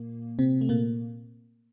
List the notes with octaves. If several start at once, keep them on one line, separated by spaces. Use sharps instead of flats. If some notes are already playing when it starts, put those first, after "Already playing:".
Already playing: A#2 A#3
C3 C4
A3
A#2 A#3